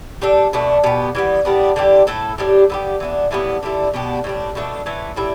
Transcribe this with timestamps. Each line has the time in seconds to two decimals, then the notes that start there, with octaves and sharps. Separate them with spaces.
0.22 G3 D4 A4
0.53 B2 A3 D4
0.84 B2 B3 G4
1.15 E3 G3 B3
1.45 A2 G3 B3 D4
1.76 D3 G3 E4 G4
2.07 A2 A3 E4 A4
2.38 A2 G3 D4 G4
2.70 D3 B3 E4 G4
3.00 E3 B3 D4
3.31 A2 E3 G3 B3
3.63 D3 G3 E4 A4
3.94 B2 B3 D4 G4
4.24 A2 G3 D4
4.55 B2 A3 D4 A4
4.86 A2 E3 A3
5.16 A2 G3 E4